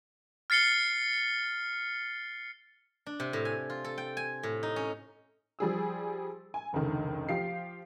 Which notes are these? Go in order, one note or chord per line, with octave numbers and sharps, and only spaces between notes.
F6 A6 C7 C#7 G7
D4
C3
A2
G#5
F4
A4
G5
G#5
A2
D#4
C#4
F3 G3 G#4 E6
G#5
F1 C#2 D3 D#3
F3 G4 F5 C7